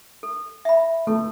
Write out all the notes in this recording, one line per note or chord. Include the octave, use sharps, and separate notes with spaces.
A4
E5 B5
A3 A4